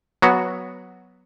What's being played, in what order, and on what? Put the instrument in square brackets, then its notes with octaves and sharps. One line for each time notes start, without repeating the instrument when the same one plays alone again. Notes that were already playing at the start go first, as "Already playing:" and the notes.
[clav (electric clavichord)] F#3 B3 F#4